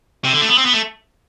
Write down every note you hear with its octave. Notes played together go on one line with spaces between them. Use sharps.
C3
D3
A3
B3
C4
B3
A3